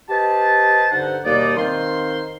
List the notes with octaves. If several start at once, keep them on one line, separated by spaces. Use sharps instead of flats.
G4 B4 C5 D#5 A5
G2 D3 D#4 C5 F#5
D#2 B2 G3 A#3 D#4 D5
D#3 C4 C5 F5 C6